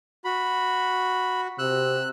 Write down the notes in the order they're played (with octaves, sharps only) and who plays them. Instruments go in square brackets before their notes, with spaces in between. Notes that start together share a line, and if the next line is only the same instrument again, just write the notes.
[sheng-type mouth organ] F#4 [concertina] B5
[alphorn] C3 [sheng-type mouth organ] E6 [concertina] F#6